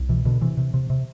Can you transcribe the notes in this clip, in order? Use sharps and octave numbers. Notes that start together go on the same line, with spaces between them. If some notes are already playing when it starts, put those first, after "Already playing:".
Already playing: C2
B2 E3
B2 D3
C3 E3
C3
C3
C3